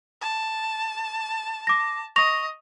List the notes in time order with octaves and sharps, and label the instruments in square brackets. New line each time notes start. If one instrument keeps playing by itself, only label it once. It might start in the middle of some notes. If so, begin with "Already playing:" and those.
[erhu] A5
[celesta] D6 A#6
[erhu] D#5 [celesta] C#6 A#6 F7